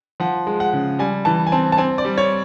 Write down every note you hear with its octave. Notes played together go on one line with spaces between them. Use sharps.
F3 F#5
G#3
F#5
C#3
G3 G#5
E3 A5
G#5
C4 A5
A5
C4 G#5
D5
G3
C#5